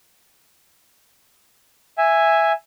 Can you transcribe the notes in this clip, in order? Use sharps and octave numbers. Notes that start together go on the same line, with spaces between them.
E5 G#5